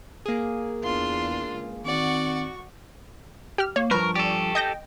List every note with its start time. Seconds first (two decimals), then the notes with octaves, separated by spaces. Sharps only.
0.26 A#3 G#4
0.84 E2 D4 F4 C6
1.50 C#2
1.85 D#3 C4 F#4 D5 F#5 C#6
3.58 G4 F6
3.76 A#3 C#5
3.91 G2 F3 A#4 B4 C#6
4.15 G4 A4 D5
4.55 D#5 G5 G6 A#6